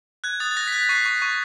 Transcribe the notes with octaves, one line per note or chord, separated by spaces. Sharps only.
F#6 G#6
D#6 A6
A6
F#6 A#6
B6
F#6
B6
C#6 C7
C#6
C#6